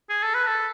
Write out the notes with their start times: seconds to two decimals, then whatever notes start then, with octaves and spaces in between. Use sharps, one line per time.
0.09 G#4
0.23 A4
0.34 B4
0.47 A4